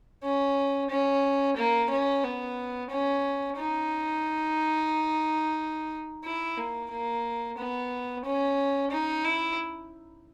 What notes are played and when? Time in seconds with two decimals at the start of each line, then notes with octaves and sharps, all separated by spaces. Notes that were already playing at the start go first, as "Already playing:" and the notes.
0.23 C#4
0.90 C#4
1.57 A#3
1.90 C#4
2.24 B3
2.90 C#4
3.57 D#4
6.24 E4
6.58 A#3
6.91 A#3
7.58 B3
8.24 C#4
8.91 D#4
9.25 E4